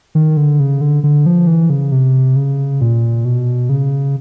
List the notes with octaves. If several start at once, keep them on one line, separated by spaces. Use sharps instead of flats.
D#3
D3
C#3
D3
D3
F3
E3
C#3
C3
C#3
A#2
B2
C#3